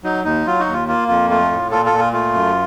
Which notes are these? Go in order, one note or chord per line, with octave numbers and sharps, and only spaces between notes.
F#3 D#4
D#2 D#4
F#3 F4
D#4 F#4
D#2
F4
A#3 F4
F2 F4
A3 F4
A2
A#2 F4 A4
F4 A4
A#2
F4
A3 F4
F#2